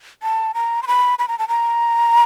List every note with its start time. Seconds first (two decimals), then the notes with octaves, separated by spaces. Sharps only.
0.23 A5
0.54 A#5
0.83 C6
0.87 B5
1.19 B5
1.28 A#5
1.39 A5
1.48 A#5